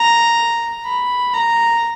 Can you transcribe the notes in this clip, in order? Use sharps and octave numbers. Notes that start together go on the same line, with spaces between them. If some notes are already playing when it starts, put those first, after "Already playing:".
Already playing: A#5
B5
A#5